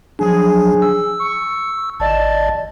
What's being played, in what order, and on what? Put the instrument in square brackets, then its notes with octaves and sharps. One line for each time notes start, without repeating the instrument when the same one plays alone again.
[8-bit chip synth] F3 F#3 D4 [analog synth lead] G#4
[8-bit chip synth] E6
[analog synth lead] C#6
[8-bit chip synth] G#1 D5 D#5 [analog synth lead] A5